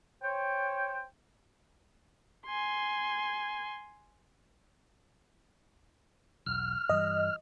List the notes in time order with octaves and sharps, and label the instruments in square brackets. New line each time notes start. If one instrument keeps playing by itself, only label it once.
[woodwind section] C5 C#5 G5
[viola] G#5 C6
[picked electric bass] E1 B1 [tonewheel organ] F6
[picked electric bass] G2 E3 G3 [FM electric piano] D#5